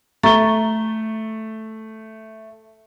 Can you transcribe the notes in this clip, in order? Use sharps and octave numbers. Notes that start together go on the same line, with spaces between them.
A3 A#5 C#6 A6 G7